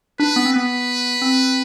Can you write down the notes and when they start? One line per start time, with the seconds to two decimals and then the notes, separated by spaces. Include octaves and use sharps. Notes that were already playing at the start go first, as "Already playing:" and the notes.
0.19 D4 B4
0.36 B3
0.46 C4
0.53 B3 B4
1.22 C4